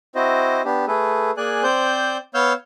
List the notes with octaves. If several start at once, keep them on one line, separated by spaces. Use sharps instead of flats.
C4 E4 F#4 C5 D#5
B3 D4 G4
A3 G#4 A4 B4
A#3 G#4 D5 G#5 F#6
C4 C5 D5 G6
B3 C#5 F5 E6 F6 G6